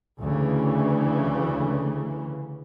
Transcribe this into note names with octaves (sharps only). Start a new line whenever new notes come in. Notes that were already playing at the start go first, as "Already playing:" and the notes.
D2 C#3 E3